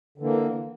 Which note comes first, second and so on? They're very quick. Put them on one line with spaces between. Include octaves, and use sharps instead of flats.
D3 E3 A#3